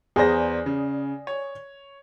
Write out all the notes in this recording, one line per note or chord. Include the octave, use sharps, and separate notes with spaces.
E2 G#4 C5 D5 A#6
C#3
C#5